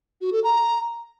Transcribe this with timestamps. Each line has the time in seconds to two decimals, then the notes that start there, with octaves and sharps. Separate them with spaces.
0.21 F#4
0.33 A4
0.44 A#5